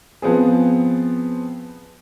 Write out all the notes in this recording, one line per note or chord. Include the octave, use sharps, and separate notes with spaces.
F3 B3 C4 G#4